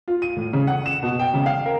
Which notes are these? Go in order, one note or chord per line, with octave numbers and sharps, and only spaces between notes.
F4
D#7
A2
C#3
F#5
E7
B2
G5
C#3
F5
A#4